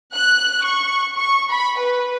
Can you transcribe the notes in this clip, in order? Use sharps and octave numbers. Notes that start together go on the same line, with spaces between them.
F#6
C#6
C#6
B5
B4